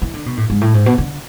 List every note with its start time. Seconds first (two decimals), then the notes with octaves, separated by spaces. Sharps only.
0.02 E3
0.14 D3
0.26 B2
0.37 A2
0.50 G#2
0.61 A2
0.74 G#2
0.86 B2
0.98 D3